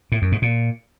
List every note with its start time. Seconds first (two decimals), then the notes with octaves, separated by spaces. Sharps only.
0.12 A2
0.22 F#2
0.32 G#2
0.42 A#2